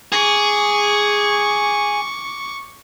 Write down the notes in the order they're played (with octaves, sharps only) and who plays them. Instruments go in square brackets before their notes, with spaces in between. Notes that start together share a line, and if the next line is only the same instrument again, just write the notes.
[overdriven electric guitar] G#4 [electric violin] C#6 D6